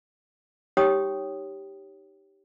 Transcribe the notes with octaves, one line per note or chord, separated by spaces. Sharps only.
D#4 G4 C#5 G5 C6 D#6